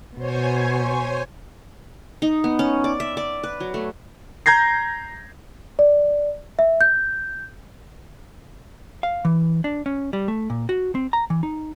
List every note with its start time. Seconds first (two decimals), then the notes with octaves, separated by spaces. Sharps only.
0.17 B2 C5 C#5 G#5
2.22 D#4
2.44 B3
2.59 C#4
2.84 D5
3.00 E5
3.17 D5
3.43 B4
3.60 F#3
3.74 A3
4.46 A#5 G6 G#6 A#6 C7
5.79 D5
6.59 E5
6.81 G6
9.03 F5
9.25 E3
9.64 D4
9.86 C#4
10.13 G3
10.28 A3
10.50 A#2
10.69 F#4
10.95 C4
11.13 A#5
11.30 E3
11.43 D#4